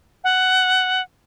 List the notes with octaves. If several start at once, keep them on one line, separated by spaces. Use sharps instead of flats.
F#5